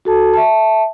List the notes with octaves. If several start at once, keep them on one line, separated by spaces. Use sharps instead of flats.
F#4 A4 A5
E5 A5